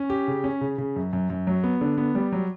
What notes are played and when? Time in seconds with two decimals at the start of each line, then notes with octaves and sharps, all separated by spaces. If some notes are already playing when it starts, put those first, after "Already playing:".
Already playing: C#4
0.10 G4
0.28 C#3
0.44 C#4
0.61 C#3
0.78 C#3
0.96 F#2
1.13 F#2
1.30 F#2
1.47 F#3
1.64 B3
1.81 D3
1.98 B3
2.15 G3
2.32 F#3